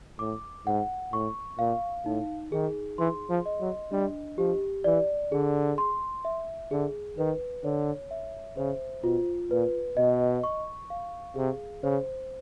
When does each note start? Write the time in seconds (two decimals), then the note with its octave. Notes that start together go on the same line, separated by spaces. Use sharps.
0.19 A2 D6
0.66 G#2 F#5
1.13 A2 C#6
1.59 A#2 F5
2.05 A2 D#4
2.52 D#3 G#4
2.98 E3 C6
3.29 F3
3.46 D#5
3.61 F#3
3.92 G3 D4
4.38 F3 G4
4.84 E3 D5
5.32 D3 G#4
5.78 C6
6.25 E5
6.71 D3 G#4
7.18 D#3 B4
7.64 D3 C#5
8.11 E5
8.57 C#3 C5
9.03 B2 F4
9.50 A#2 B4
9.97 B2 D#5
10.43 C#6
10.90 F5
11.36 C3 G#4
11.83 C#3 C5